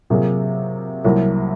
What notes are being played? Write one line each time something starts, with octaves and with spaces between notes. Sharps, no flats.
C3 F#3 A#3 F4 G#4
C2 C3 F#3 A#3